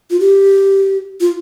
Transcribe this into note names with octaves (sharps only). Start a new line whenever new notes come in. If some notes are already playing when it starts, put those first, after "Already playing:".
F4
G4
F4